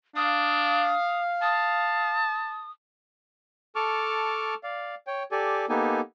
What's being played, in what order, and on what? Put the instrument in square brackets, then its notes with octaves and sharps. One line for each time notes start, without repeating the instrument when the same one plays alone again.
[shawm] D4 [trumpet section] F5 [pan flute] D#6
[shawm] A5 [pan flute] D#6
[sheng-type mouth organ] A4 A5 C#6 D6 F6
D5 F5
C#5 G5
G4 A4 D5 G#5
A#3 B3 D#4 G4 A4 G#5